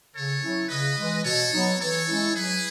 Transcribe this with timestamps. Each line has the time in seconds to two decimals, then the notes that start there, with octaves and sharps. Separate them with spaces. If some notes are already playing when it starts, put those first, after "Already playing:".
0.14 C#3 A4 C#5
0.42 F#3 C#4 E4
0.69 C#3 B4 D#5
0.97 E3 G#3
1.24 B2 A4 C#5
1.52 F#3 B3 D#4
1.80 E3 A4 C#5
2.08 G#3 C#4 E4
2.35 F#3 G#4 B4